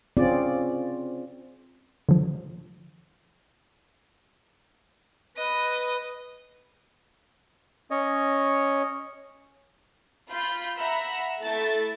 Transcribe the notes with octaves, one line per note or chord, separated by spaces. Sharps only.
C4 C#4 F4 G#4 D5
D3 F3
B4 D#5
C#4 C#5 D#5
F4 B5 G6
E5 F#5 A#5 B5 E6
A3 E4 A4 E5 A6